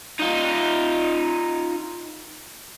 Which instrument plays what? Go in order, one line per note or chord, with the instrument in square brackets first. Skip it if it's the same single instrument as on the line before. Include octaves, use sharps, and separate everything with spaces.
[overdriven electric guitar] D#4 F4